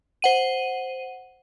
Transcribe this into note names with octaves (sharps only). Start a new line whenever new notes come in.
C5 F#5 D#7